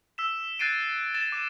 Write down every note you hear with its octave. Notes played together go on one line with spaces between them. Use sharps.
E6 B6 E7
F#6 G#6 A6 C7 D7 D#7
A6 E7
D6 D#7